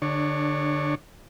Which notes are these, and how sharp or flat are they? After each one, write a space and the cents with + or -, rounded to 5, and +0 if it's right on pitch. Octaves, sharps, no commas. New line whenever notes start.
D3 +0 D4 +25 C#5 +0